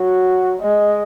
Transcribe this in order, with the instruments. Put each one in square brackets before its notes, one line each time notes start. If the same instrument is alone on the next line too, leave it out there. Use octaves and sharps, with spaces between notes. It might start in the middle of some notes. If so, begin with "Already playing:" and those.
Already playing: [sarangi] F#3 [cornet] F#4
[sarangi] G#3 [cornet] D#5